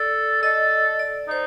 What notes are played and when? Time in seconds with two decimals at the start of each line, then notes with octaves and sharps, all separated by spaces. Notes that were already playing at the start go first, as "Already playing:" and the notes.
Already playing: A4 D5
0.42 A4 D#5
0.99 D5
1.28 D#4 C5